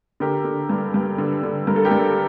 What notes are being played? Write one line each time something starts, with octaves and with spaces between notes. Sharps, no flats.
D3 G4 A#4
D3
G2
G2
D3
D3
G2 A#4
A4
G4 A#4
G2